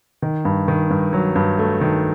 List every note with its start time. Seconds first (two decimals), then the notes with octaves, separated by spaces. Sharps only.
0.22 D#3
0.45 G2
0.68 D#3
0.90 G2
1.13 F#3
1.36 G2
1.59 A3
1.81 D#3